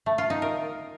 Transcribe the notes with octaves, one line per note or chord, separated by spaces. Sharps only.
A3
F4
D#4
A#4